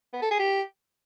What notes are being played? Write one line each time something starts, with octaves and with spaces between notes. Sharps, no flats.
B3
A4
G#4
G4